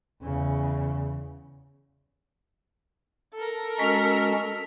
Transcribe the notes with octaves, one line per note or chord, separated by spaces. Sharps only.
E2 C#3
A4 A#4
G#3 C#4 F#4 B6 F7